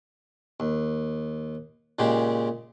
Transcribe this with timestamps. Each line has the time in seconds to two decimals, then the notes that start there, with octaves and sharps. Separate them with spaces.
0.60 D#2
1.99 A#2 C#3 G#3 G4